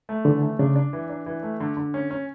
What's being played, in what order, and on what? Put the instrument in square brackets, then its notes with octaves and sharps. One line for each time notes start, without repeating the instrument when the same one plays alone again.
[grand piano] A3
[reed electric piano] D3 [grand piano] E3
[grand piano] A3
[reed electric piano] C#3 [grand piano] D4
[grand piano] D4
E3
D4
E3
A3
D3
D3
C#4
C#4